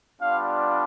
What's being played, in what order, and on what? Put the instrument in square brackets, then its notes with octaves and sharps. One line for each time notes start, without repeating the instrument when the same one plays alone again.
[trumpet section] G3 B3 D4 F4 F5